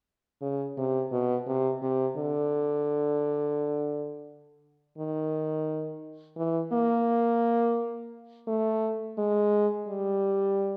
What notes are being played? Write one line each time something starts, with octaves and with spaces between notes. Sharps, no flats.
C#3
C3
B2
C3
C3
D3
D#3
E3
A#3
A3
G#3
G3